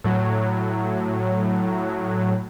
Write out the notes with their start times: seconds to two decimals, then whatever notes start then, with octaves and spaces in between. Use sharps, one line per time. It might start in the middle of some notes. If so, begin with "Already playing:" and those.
0.04 A2 F#3